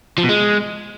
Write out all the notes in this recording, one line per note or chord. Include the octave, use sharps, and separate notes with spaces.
F3
B2
G#3